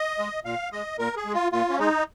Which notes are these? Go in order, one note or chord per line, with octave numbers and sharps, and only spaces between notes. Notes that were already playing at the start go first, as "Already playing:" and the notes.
Already playing: D#5
G#3
A#2 F5
G#3 D#5
A#2 A#4
G#4
G#3
F4
A#2 F4
C#4
G#3 D#4